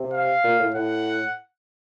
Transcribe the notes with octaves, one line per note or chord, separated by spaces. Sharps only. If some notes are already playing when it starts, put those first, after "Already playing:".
Already playing: C3
F5
A#2
A2
A2 F#5